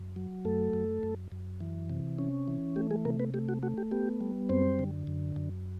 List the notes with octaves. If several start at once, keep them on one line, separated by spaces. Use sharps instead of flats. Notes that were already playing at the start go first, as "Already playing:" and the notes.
Already playing: F#2
F#3
F#2 A3 A4
F#2
F#2
F#2
E3
C3
C#4
E3
A3 G4
G#3 G#4
C3 A#3 A#4
B3 B4
A3 G4
F#4
A3 F#4
G4
B3 G4
G3
F#2 C4 C5
D3
F#2
F#2